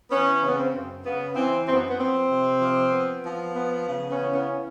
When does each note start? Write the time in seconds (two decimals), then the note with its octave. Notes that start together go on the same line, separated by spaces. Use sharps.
0.11 E3 B3 C#4
0.42 C#3
0.48 B3
0.58 C4
0.73 F#2
1.04 C#3 B3
1.36 E3 C4
1.67 F#2 C4
1.75 B3
1.89 B3
1.99 F3 C4
2.29 C3
2.61 F3
2.92 B3
3.23 F3
3.55 B3
3.86 C#3
4.09 B3 C#4
4.17 E3
4.33 B3 C#4